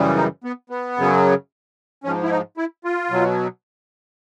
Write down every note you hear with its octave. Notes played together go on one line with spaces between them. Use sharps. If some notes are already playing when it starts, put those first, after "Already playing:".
Already playing: F#2 C#3 E3 G3
D#4
B3
B3
F#2 C#3 F#3
G#2 F3 C#4
E4
D#4
E4
F4
B2 F#3